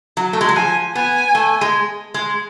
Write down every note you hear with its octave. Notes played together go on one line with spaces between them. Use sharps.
F#3
A3
G#3
F#3
F3 G#5
B3 G#5
A3
G#3
G#3